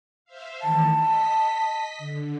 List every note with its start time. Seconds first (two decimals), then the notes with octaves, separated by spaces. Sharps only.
0.25 C5 E5 F5
0.62 D#3 E3 A3 A5
0.93 D#5 B6
1.98 D3